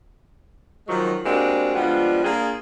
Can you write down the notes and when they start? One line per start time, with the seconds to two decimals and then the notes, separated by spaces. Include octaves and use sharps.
0.88 D#3 F3 F#3 G#3 D#4 F4
1.25 G3 G#3 A#3 C4 D4 F#4
1.76 F3 G3 G#3 B3 D4 F4
2.24 A#3 D4 F4 G#4